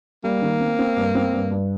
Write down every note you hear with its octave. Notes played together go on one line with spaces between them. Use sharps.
G3 A#3
D#3
C4
C4
G2
C4
G2
G2